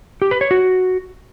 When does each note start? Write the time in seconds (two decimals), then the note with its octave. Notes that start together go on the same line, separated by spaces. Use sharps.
0.22 G4
0.31 B4
0.41 C#5
0.51 F#4